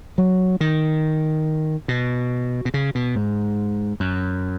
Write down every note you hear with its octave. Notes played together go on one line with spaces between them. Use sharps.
F#3
D#3
B2
B2
C#3
B2
G#2
F#2